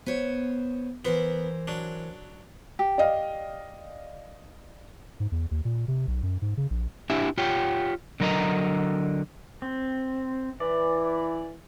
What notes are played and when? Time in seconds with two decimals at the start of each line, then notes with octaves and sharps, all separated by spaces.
0.06 B3 C5 C#5
1.05 E3 B3 A#4 C5
1.68 F#3 D4
2.79 G4
2.98 D5 D#5 F5
5.20 G#2
5.32 E2
5.51 D#2
5.65 A#2
5.88 C3
6.07 B1
6.23 F#2
6.42 G#2
6.57 C#3
6.70 A#1
7.10 D4 E4 G4 E5 G#5
7.38 F4 G4 C#5 G5
8.20 D3 F#3 A#4 B4 D#5 A#5
9.62 C4
10.60 E3 D5